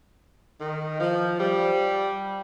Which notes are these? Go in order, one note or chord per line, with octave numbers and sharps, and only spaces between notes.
D#3
F3
G3